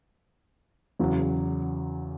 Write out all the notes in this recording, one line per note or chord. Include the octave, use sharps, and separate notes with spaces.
E2 C#3 F#3